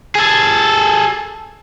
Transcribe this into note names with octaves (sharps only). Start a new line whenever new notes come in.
G#4 A4